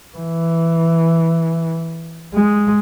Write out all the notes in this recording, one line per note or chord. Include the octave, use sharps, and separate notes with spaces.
E3
G#3